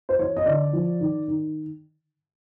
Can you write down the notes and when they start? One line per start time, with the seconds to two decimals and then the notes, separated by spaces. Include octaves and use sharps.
0.09 C5
0.19 E3 C#5
0.37 D#5
0.46 D3 D5
0.73 F3
1.00 D#3
1.28 D#3